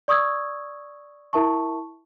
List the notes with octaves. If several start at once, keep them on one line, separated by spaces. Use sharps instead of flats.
D5 C#6 D#6 E6 G#6
E4 A#4 E5 A5 C#6